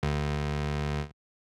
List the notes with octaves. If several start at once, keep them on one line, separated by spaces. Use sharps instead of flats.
D2